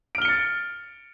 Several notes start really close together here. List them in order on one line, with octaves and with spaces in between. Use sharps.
D7 F6 G7 C#7 A6